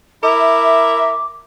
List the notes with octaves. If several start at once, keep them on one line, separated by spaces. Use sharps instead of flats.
E4 A#4 E5 D6